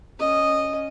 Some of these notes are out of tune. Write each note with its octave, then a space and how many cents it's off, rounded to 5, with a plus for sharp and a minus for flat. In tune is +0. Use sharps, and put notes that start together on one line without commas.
C#4 +0 D#5 -10